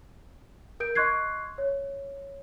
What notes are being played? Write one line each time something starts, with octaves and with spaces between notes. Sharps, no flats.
A#4 G6 D7
D#5 C6 C#6 F#6 G#6 C7
C#5